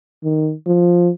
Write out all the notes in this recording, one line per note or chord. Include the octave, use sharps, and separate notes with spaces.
D#3
F3